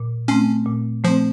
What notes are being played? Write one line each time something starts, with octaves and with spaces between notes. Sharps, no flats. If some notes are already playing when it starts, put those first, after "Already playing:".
Already playing: A#2
A3 C4 C#4
A#2
F3 A3 C4